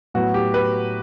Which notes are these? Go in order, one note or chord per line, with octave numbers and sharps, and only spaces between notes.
A2 F#3 B3 F#4
G4
B4